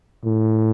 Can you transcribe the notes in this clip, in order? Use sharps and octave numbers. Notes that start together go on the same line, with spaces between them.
A2